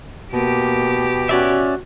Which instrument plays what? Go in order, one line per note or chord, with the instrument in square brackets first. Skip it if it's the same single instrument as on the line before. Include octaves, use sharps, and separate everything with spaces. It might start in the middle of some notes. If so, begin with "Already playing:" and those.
[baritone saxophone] B2 [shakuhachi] A#3 [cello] G4
[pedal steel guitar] C#4 D5 E5 [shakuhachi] F#4